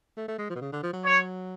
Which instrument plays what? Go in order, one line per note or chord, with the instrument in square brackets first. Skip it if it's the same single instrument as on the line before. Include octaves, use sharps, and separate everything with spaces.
[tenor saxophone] A3
A3
G#3
F3
B2
C#3
D3
F3
F#3
[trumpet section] C#5